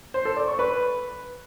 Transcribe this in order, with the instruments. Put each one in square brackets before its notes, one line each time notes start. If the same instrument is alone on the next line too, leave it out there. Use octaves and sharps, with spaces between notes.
[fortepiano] C5
A4
D5
C#6
B4